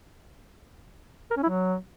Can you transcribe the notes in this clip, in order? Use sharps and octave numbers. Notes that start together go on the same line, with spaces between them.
A#4
C#4
E4
F#3